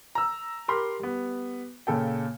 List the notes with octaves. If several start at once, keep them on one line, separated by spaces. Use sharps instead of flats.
A#5 E6
G4 A#4 B5 C6
G3 B3
A#2 C#3 A4 G5